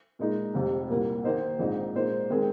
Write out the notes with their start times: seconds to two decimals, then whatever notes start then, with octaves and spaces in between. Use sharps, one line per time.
0.19 A#2 G#3 D#4
0.54 F1 F2 C3
0.90 C2 A#2 A#3
1.24 D#3 A#3 D#4 C5 D#5
1.59 A#1 G#2 G#3 C4 D#4
1.95 A#2 G#3 D#4 C5
2.30 D#3 G#3 C4 G#4